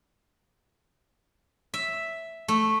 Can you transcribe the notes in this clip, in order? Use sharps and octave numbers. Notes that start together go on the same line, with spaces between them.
E5
A3